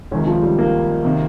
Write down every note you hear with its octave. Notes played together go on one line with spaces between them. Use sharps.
C#2 C3 D#3 C#4
F3
G3
A#3
C3 D#3